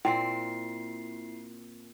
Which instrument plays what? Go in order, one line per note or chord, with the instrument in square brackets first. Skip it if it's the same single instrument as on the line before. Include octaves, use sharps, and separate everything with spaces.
[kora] A#2 C4 [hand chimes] E4 C7 [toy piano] G5